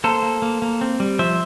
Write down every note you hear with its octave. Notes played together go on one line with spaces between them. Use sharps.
A#3 A4 C5
A#3
A#3
A#3
C4
G3
F3 C5 E5